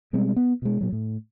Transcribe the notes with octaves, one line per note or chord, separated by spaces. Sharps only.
B2 G3 G#3 C4
B3
B2 G#3
A#2 F#3
A2